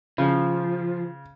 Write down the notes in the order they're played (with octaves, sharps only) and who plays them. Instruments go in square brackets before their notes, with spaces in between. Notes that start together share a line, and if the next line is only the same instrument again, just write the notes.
[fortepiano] C#3 [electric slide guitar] F3